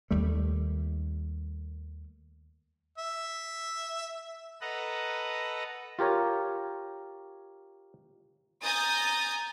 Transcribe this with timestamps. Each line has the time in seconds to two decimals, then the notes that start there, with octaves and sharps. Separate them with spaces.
0.11 D#2 G3 A3
2.98 E5
4.61 A4 B4 D#5 F#5 A#5
5.99 F4 G4 A#4 C#5
8.64 G#5 A#5 D#6 G6 A6